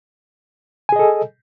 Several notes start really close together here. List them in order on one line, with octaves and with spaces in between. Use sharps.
G#5 G#4 D#5 A4